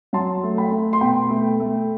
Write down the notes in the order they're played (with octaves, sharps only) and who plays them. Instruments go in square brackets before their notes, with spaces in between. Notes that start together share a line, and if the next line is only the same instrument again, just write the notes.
[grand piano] F#3 A5 C6
A3
G5 B5
A3
C6
B2 G5 B5
A3
A3